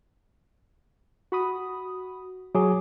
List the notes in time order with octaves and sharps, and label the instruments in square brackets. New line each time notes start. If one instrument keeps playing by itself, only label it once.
[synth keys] F#4 B5 D#6
[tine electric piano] F#3 G#4 [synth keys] D6